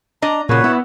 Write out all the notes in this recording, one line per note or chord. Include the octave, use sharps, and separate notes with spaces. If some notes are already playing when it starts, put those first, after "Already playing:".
D4 D#5 A#5
A#2 C#3 F3 F#4 B4 C#5
B3 E4